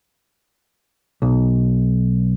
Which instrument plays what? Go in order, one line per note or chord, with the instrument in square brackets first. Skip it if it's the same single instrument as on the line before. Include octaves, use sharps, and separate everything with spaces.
[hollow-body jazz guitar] B1